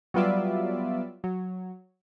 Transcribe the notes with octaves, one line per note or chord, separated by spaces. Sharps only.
F#3 G3 B3 F4 D5 E5
F#3